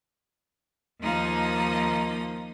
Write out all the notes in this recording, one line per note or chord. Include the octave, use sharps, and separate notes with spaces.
D#2 F3 A#3 D#4 D#6